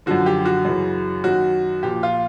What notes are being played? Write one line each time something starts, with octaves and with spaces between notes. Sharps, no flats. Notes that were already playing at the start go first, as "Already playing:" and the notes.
F#2 D3 F3 F#4
G4
F#4
F#2 C#3 E3
F#2 D#3 F#3 F#4
A#2 F3 G4
F4